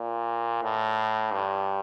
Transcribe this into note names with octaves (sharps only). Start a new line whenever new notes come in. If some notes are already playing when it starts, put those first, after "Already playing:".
Already playing: A#2
A2
G2